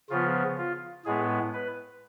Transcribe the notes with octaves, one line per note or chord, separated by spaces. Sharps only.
C#3 F3 B3 F4
F4
A2 G#3 B3 G#4
B4